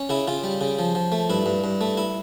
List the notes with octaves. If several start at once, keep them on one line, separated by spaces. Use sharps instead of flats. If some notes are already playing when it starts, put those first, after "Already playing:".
Already playing: C#4
C#3 E4
C#3 F4
G3
C#3
F3
F3
A3
G2 E4
G2
G2
A3
E4